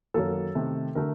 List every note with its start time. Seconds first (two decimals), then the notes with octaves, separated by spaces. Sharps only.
0.14 F#2 D#3 F#3 A#3 A4
0.55 C3 D#3 A3
0.95 D3 A3 A#4